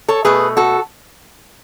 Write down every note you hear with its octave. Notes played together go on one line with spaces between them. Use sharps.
A4 C#5
B2 A3 G#4 B4
F#4 A4